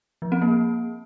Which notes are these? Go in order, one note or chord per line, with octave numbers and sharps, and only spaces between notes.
F3
C4
A#3